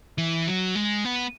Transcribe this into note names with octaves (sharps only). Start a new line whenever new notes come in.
E3
F#3
G#3
B3